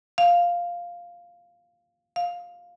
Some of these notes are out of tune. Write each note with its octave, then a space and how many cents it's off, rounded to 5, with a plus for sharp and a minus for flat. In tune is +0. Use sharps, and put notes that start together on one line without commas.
F5 +0
F5 +10